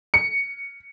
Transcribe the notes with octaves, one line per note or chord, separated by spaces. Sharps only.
C#7